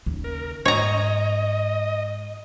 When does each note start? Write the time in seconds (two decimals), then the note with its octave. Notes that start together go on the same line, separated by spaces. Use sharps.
0.06 D#2 C#3
0.24 A#4
0.65 G#2 C#5 D#5 A#5